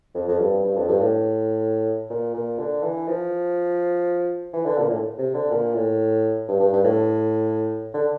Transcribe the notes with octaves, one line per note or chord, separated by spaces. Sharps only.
F2
F2
G2
G2
F2
G2
A2
A#2
A#2
D3
E3
F3
E3
D3
A#2
A2
C3
D3
A#2
A2
G2
G2
G2
A2
D3